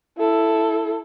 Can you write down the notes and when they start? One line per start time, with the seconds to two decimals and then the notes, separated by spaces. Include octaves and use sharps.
0.18 E4 A4